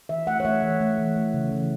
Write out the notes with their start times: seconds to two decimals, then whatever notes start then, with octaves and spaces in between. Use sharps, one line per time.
0.09 E3 E5
0.27 A3 F#5
0.40 C#5
0.45 A3 E5
0.62 E3
0.80 A3
0.98 E3
1.16 A3
1.34 C#3
1.52 E3